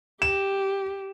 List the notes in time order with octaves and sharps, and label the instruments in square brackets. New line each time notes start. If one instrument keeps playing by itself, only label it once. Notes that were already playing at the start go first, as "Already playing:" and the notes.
[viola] G4 [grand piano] E7